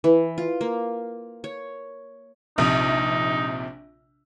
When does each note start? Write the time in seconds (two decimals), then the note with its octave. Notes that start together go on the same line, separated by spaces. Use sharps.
0.04 E3
0.38 F4
0.61 A#3
1.44 C#5
2.58 A#1 C3 D#4